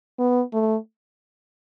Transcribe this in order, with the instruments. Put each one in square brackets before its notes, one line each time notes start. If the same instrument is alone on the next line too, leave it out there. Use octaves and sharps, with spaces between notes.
[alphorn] B3
A3